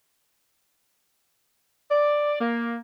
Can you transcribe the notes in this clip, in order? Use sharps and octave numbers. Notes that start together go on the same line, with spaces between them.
D5
A#3